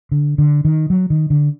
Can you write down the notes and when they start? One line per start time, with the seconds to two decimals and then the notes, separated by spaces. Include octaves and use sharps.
0.11 D3
0.38 D3
0.65 D#3
0.90 F#3
1.10 D#3
1.30 D3